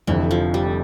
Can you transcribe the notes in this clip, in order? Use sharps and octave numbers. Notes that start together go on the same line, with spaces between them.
F1 F2 D3 E3
F3
G3